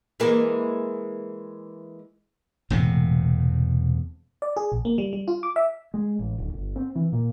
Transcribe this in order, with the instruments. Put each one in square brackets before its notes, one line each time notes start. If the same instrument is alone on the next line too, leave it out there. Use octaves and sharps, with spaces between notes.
[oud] E3 G#3 A#3
[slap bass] E1 A2 C3
[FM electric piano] D5
G#4
A#1
A#3
G3
G3
F4
D6
E5
[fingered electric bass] G#3
A1
D1
G1
C4
E3
A#2